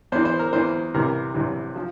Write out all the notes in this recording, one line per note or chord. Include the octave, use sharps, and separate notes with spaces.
E2 E3 C5
C5
A#4
E2 E3 C5
C2 C3 E3 A#4
C2 C3 E3
F3